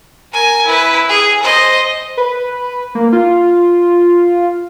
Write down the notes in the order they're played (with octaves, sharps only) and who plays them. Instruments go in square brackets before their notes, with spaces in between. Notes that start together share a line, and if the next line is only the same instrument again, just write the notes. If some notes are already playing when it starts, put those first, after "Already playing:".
[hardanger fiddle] A#4 G#5
E4 B4
G#4
C5 D#5
[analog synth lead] B4
A#3
F4